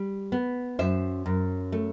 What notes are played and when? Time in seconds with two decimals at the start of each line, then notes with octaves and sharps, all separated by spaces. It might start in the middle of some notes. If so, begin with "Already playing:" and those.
Already playing: G3
0.32 B3
0.79 F#2 C5 E5
1.26 F#2
1.72 A3